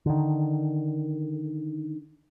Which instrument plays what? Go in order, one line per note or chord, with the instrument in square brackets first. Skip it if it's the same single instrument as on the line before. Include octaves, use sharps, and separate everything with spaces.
[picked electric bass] D3 D#3